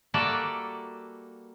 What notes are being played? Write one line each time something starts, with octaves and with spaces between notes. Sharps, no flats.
G3 A#3 F#4 A4 D5 E5